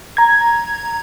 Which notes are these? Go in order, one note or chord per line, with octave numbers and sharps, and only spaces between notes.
A#5 G#6